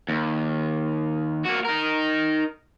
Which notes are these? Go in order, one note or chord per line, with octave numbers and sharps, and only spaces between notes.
D#2
A#3 F#4
D#4 A#4